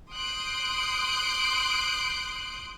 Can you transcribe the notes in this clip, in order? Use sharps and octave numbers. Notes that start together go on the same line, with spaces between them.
C6 D#6 F#6 G6 C7 D7